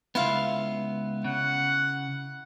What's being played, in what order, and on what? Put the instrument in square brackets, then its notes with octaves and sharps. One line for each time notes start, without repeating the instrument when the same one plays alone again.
[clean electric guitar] C#2 B3 [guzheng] E4 F4 F5
[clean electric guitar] C#3 [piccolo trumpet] F#5